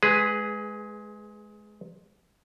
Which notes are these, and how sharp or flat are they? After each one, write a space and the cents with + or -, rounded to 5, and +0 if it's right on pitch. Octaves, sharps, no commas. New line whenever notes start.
G#3 +25 G#4 +0 B4 +10